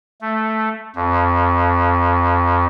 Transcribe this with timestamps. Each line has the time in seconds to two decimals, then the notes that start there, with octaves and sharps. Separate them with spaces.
0.21 A3
0.96 F2